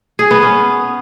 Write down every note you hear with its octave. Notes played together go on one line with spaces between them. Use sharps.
G#4
B3
C#4